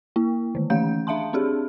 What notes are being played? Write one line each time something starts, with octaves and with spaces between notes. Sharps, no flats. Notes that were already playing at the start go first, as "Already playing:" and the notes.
A#3 E4
D3 D#3
E3 A3 C#4 F5 G6
D4 E5 F5 A5 C6
C4 D4 G4 G#4